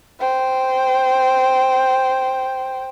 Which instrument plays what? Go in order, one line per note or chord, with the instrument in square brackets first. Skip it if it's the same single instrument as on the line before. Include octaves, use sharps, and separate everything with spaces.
[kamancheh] C5 G5